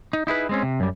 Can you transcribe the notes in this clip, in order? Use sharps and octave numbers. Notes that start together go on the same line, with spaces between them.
D#4
D#4 E4 G#4 B4
G#3 C4 C#4
C3
F#2 G3